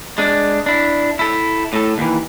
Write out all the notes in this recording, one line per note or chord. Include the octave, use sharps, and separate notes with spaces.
G#3 D4
D4 E4
E4 A4
A2 A4
D#2 E3